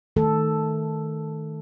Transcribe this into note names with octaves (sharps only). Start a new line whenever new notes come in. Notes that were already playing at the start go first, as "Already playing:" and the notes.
D#3 A3 A4